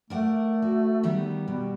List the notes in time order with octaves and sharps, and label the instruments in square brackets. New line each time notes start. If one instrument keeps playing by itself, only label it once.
[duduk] A3 [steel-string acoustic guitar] A#4 D5 F#5
[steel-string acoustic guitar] F#4
D#3 G3 B3
[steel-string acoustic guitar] B2 [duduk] G3